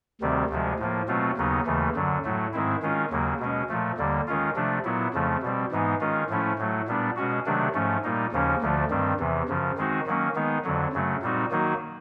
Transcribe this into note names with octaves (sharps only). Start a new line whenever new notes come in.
D2 C3 D#3 G3 C4
D2 C3 F3 G#3
A2 F3 A#3
B2 F#3 A3 C4 F4
D#2 C#3 F#3 B3 D#4
D#2 C#3 E3 A3
F#2 D3 F#3
A2 F#3 A3
G#2 D#3 G#3 C4 E4
D#3 G#3 C#4 F4
D#2 C#3 F#3 A#3
B2 G#3 C#4
A#2 F3 A3
D#2 D3 G3 A#3
D#3 G#3 C#4 F4
C3 F3 A3 D4
A#2 F#3 B3 E4
F2 C#3 F3 A3
B2 G3 C4
G#2 E3 G#3 B3 D#4
D#3 G#3 C#4 F4
A2 F3 A3 C#4 E4
A2 F#3 A3
A#2 G3 B3 D4
B2 G#3 C#4 F#4
C3 D#3 F#3 A3 D4
G#2 F3 A3 C#4
A#2 G3 A#3 D#4
D#2 C#3 F3 A#3 C#4
D2 D3 F3 A3
G2 D#3 G3 C4
E2 C3 E3
F#2 C#3 F3
D#3 G#3 C4 D#4 F#4
D#3 F#3 A#3 C#4
D#3 G#3 B3 D#4
F2 D3 F#3
F#2 C#3 F#3 A3
A#2 G3 C4 D#4 F#4
D#3 F#3 A#3 D#4 F#4